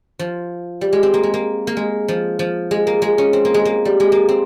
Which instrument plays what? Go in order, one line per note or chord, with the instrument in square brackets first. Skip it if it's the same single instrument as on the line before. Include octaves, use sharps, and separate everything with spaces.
[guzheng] F3
G3
G#3
C4
A#3
G#3
A#3
A#3
G#3
F3
F3
G#3
A#3
G#3
C#4
C4
A#3
G#3
A#3
G3
G#3
A#3
C4